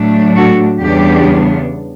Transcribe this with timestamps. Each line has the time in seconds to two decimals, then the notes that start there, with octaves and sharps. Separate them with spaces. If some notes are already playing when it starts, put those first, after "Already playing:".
Already playing: A2 F#3 A3 D4
0.36 F#4 A4
0.82 E2 C#3 G3 B3 D4 G4